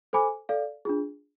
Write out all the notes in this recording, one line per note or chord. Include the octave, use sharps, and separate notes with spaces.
A4 C5 G#5 B5 D6
A4 D5 F5
D4 F4 G#4